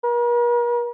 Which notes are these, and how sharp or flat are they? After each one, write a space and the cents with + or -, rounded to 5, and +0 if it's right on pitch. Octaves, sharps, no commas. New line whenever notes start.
A#4 +45